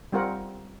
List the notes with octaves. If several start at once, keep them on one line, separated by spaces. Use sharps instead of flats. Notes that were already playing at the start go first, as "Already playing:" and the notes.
G3 C4 F4 A#4 F#5